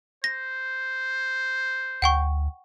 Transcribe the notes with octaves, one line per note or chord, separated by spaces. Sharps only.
C5 A#6
D2 F#5 G5 C#6